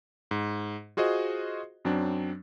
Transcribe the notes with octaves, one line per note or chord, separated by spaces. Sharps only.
G#2
F4 F#4 G#4 C5 D#5
F#2 F#3 C4 D4